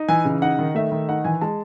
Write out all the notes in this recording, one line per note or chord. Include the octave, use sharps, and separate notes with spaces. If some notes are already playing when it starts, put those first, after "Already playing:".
Already playing: D#4
E3 G#5
C#3
D#4 F#5
D#3
A3 E5
D#3
D#4 F#5
E3 G#5
G#3 A5